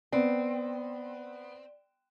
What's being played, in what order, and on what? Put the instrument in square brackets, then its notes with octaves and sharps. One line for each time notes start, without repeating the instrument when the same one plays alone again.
[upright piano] B3 [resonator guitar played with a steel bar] C4 [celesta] D5